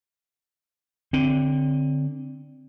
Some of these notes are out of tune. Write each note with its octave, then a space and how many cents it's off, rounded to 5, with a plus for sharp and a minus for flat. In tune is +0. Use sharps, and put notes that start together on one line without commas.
D3 -5 C4 +0